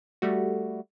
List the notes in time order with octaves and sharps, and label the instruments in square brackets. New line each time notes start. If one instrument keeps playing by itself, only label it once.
[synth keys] G3 A3 F#4